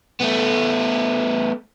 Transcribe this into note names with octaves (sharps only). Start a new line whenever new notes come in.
A3 B3